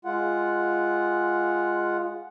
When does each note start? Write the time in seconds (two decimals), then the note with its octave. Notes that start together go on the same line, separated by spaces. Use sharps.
0.05 G#3 F4 F#5